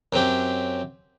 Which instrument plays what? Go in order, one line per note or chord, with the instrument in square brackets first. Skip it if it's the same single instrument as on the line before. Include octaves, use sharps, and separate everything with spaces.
[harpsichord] F#2 F#3 C4 G4